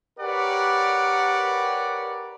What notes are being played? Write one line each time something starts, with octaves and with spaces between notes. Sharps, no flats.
G4 A#4 B4 C#5 D5 F#5